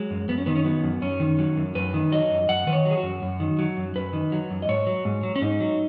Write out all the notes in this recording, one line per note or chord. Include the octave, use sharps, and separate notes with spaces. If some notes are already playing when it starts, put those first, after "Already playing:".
Already playing: F#3 G#3
F#2
F#2 B3
C#4
D#3 B3
C#4
F#3 B3
F#2
F#2 C#4
D#3
F#3
F#2
F#2 B4
D#3
F#3 D#5
F#2
F#2 F#5
D#3 B4
C#5
F#3
G#4
F#4
F#2
F#2
D#3
F#3
F#2
F#2 B4
D#3
F#3
F#2
D#5
G#2 C#5
F#3
G#2
F#3
C#4
G#2 D#4
F#3